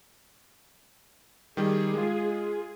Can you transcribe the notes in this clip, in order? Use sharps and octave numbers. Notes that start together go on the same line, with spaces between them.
D#3 G3 G#4
G#3 F4